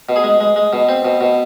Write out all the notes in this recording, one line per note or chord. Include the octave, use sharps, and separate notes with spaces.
B2
G#4
G#3
G#3
G#3
B2
C4
B2
B2